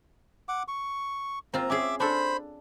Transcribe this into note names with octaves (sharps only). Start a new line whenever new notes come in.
F#5 D6
C#6
A#3 C4 F4 A#5
C#4 G#4 E5 D6
D4 A4 C5 B5